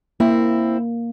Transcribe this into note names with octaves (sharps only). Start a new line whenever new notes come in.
A#3 C4 E4